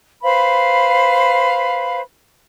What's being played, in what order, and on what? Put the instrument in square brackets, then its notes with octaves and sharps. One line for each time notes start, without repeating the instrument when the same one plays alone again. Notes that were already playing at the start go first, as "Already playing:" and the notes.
[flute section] B4 C5 F5 B5